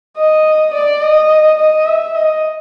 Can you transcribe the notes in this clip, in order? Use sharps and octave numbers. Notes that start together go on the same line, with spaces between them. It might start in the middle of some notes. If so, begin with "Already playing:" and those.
D#5
D5
D#5
D#5
E5
D#5